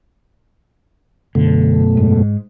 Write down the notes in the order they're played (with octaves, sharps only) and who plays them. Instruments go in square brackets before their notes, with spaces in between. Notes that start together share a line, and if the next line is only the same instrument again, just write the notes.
[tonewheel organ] F#2 B2 A3 [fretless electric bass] D3
[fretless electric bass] G#2